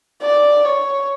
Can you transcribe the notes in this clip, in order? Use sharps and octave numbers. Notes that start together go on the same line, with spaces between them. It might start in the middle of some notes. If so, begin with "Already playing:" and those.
D5
C#5